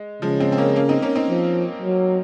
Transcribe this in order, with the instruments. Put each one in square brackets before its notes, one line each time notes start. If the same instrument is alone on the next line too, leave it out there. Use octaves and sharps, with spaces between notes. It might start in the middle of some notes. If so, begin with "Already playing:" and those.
Already playing: [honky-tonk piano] G#3
[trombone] C#3 [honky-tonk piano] F3 G#3
[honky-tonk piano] G#3 C4
C4
A#3 C#4
A#3 C#4
C4 D#4
A#3 C#4
C4 D#4
[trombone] F3
F#3